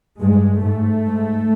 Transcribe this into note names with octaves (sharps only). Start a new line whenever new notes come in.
G2 G#3
G#2 A3
G#2